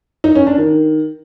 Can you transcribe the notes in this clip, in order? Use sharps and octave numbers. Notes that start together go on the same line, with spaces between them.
D#4
C#4
D4
D#3